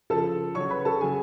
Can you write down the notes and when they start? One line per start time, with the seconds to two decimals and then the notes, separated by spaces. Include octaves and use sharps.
0.10 C#3 F3 A4 A5
0.55 C#3 F#3 C#5 C#6
0.71 B4 B5
0.85 A4 A5
1.01 C#3 F#3 G#4 G#5